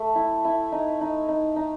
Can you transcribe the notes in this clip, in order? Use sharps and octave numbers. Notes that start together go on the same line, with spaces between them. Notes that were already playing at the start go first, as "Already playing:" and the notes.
Already playing: A3
E4
E4
D#4
D#4
D#4
D#4